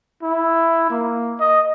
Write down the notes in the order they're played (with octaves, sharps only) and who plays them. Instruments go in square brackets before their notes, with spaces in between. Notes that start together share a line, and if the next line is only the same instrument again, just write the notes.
[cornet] E4
A#3
D#5